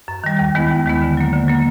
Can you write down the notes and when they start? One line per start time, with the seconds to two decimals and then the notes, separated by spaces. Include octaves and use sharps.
0.08 F#2
0.24 D#3 G3
0.39 D#2
0.55 D#3 G#3 B3 E4
0.71 D#2
0.86 D#3 G#3 B3 E4
1.02 D3
1.17 F#3 A#3
1.33 D3
1.48 F#3 A#3